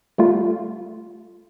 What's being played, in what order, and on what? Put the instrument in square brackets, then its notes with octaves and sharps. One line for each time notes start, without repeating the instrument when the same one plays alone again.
[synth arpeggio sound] G3 A3 F4